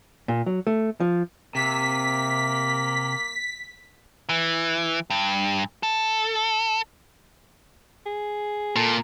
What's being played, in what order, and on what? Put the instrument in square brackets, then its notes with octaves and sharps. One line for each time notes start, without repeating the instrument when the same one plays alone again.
[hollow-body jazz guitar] A#2
F#3
A3
F3
[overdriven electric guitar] C3 [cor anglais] A#3 [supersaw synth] B6
[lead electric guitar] E3
G2
A4
[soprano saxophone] G#4
[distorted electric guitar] A#2 [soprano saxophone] A4